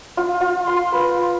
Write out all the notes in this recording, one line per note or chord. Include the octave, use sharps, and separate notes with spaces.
F4
F4
C6
B4